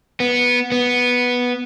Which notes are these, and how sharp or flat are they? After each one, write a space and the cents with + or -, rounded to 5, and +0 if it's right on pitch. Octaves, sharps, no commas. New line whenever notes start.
B3 -10
B3 -5